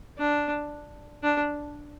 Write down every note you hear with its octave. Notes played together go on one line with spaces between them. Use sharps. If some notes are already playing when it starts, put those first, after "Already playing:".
D4
D4